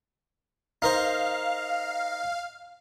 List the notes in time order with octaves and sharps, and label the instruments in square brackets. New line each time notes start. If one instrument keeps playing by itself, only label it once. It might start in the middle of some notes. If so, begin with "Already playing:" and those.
[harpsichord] D#4 A#4 C5 [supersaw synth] F5